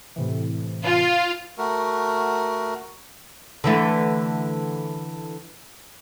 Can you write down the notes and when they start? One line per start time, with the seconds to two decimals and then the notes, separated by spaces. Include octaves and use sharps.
0.16 A2 C3 E3
0.84 F4
1.58 A3 F#4 A#4
3.64 D3 E3 A3